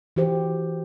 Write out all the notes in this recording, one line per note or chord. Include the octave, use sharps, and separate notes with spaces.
E3 F#4 G4 C5